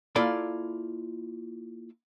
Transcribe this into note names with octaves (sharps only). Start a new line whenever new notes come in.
A#3 E4 F4 A4 D5 B5